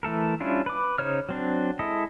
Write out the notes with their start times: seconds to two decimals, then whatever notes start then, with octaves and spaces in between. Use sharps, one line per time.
0.03 E3 A3 A4 A#4
0.40 G3 C#4 D4 E4 F4
0.66 B4 D6
0.98 C#3 D#4 C5 C#5 F6
1.29 F#3 C4 D4
1.79 G#3 E4 A4 D#5